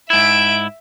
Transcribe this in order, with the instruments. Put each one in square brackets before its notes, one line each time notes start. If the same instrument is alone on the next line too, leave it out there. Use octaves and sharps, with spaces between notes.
[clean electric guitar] G#2 E4 [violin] E5 D7